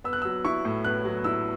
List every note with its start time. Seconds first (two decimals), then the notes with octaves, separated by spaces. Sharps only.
0.04 B3 E6
0.13 F#6
0.22 F#3 E6
0.45 E4 C#6
0.65 A2
0.85 B3 F#6
1.05 F#3
1.24 E4 E6